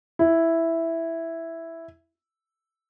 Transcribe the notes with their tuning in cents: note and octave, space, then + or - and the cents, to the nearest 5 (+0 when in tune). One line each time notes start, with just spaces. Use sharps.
E4 +0